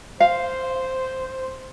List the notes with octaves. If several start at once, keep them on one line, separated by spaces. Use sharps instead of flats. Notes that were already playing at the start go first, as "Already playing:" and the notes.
C5 F5